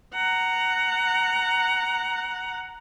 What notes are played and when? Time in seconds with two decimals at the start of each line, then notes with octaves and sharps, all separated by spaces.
0.14 F#5 A#5